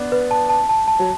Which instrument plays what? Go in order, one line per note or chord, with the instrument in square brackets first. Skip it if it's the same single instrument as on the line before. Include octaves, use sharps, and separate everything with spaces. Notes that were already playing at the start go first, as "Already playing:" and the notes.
Already playing: [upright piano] B3 D4
[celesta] B4
A5
A5
A5
A5
[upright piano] F#3